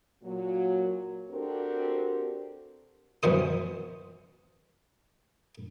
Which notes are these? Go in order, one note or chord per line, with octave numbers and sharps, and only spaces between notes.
A#2 F#3
C4 D4 F#4 G4 A4 A#4
F#2 B2 E3 C5 D#6